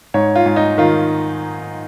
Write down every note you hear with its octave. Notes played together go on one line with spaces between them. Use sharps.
G#2 C#5
F4
G#2
D#4
D#3 F4